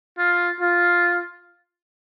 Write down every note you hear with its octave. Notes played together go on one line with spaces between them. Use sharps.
F4
F4